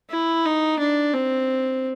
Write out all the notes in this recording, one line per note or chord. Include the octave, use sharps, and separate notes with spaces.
E4
D#4
D4
C4